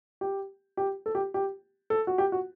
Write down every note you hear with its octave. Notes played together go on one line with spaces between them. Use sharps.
G4
G4
A4
G4
G4
A4
F#4
G4
F#4